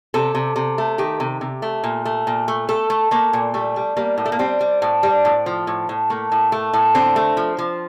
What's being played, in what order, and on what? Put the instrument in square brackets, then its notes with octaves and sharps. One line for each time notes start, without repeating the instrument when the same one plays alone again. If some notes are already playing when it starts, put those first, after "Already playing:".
[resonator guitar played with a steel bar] C3 A4
C3
C3
A3
D#3 G4
C3
C3
A3
A#2
A3
A#2
A3
A3 A4
A3
A3 A#3
A#2
G3 A3
G3
G3 A#3
A2
A3
A#3
G3 C4
G3
A2
G3
A2
F3
A2
A2
A3 A#3
A2
A3
A2
D3 C4
A3
F3
F3